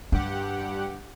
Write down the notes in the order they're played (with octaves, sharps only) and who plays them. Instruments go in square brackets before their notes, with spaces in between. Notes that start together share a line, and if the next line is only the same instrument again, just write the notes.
[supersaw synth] G2 G4 F#5 [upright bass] D4